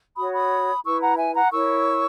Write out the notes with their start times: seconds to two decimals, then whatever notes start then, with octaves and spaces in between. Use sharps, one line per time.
0.17 F#4 C#5 B5 D#6
0.34 B5 D#6
0.84 E4 B4 C#6 E6
1.01 F#5 A#5
1.18 E5 G#5
1.35 F#5 A#5
1.51 E4 A#4 C#5 C#6 E6